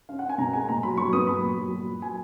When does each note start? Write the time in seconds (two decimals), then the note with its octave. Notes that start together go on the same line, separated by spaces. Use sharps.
0.09 C#4 F5
0.19 F#5
0.23 C#4
0.29 G#5
0.38 B2 A#5
0.53 G#3 G#5
0.68 A#2 A#5
0.83 F#3 B5
0.97 F#3 C#6
1.13 B3 D#6
1.27 F#3 B5
1.42 A#2
1.57 F#3
1.72 F#3
1.87 F4
2.02 F#3 G#5